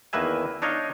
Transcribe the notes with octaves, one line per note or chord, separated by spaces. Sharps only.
E2 D#3 A#3 B4 E5 G#5
D4 D#4 C#5 D#5 F5